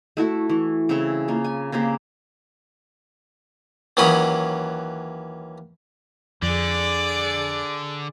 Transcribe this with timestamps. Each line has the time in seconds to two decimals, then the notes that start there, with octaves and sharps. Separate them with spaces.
0.17 A3 E4 F#4 A4
0.50 E3
0.89 C#3 C4 E4 C#6
1.28 A#3 F4
1.44 G#5
1.72 C#3 A#3 C4 G4
3.97 D#2 E3 F#3 C#4 B5 D#6
6.42 F2 D3 G#4 D5